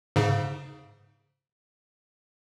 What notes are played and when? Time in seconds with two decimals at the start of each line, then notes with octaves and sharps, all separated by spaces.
0.16 G#2 C#3